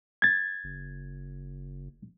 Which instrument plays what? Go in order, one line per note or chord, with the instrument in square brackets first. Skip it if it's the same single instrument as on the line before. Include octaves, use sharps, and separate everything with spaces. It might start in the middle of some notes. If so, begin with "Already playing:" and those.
[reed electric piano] G#6 A6
[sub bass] F#1